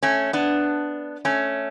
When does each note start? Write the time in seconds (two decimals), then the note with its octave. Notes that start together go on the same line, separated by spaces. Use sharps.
0.03 A3 C#4
0.33 B3 D4
1.25 A3 C#4